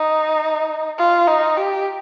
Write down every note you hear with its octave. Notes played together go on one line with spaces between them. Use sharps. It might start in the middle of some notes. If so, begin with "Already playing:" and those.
Already playing: D#4
F4
D#4
G4